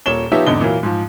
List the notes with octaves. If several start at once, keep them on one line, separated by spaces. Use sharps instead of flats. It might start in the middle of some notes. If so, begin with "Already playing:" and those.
D#1 A#2 C#5 E7 G7
F3 B3 D#4 G4 C#5 E5
G#1 E2 D3 D#5 G7
A#2 E3 F#3 A#3
G#2 F3